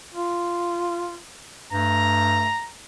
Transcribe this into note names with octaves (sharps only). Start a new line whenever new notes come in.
F4
G2 A3 A#5